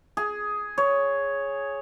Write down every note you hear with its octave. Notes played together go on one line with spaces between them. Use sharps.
G#4
C#5